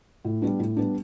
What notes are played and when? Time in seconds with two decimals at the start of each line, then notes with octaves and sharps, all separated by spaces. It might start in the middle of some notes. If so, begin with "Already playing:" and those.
0.25 A2
0.42 G3 B3 D4
0.59 A2
0.76 G3 B3 D4